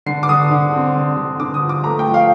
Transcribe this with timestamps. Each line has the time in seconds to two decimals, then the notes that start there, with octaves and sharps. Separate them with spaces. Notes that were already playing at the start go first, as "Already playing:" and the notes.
0.06 D3 C7
0.23 D6
0.29 D3 D#6
0.51 D3
0.74 C4
0.95 D3
1.17 D3
1.40 D3 D6
1.54 D#6
1.61 F3
1.69 D6
1.84 A3 A#5
1.99 G5
2.06 F3
2.14 F5